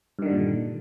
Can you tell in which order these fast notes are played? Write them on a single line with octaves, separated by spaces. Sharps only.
G2 D#3 D3 G3 A#2